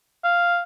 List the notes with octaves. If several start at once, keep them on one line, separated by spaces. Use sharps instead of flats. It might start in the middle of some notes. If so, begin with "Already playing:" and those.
F5